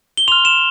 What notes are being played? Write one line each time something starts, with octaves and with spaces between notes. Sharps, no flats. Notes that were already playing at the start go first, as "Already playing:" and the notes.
G7
C6 F6 F7
E7